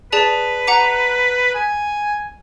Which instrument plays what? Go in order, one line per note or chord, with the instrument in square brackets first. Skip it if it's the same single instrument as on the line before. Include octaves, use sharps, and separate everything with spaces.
[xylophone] G#4 D5 A5 [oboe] B4
[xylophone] F#5 A#5 D6
[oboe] G#5